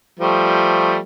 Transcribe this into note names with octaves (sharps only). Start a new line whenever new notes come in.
F3 G3 A3